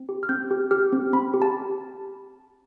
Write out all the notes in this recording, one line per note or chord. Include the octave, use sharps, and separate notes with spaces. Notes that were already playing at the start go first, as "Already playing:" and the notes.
Already playing: C4
G4
F6
C4 G6
G4
G4 F6
C4
C4 B5
G4
A5